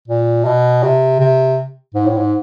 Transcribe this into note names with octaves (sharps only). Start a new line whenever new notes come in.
A#2
B2
C3
C3
G#2
A2
G#2